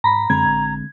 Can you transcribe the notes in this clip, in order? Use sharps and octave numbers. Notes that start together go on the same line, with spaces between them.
G#2 A#5 B5
F#2 D3 G#3 C4 A#5 G#6
A1